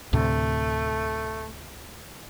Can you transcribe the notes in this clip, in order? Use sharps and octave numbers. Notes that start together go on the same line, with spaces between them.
D2 A2 C3 A3